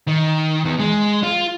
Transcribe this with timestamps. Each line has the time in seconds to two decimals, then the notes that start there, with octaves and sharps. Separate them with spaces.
0.08 D#3
0.65 E2
0.80 G#3
1.23 F4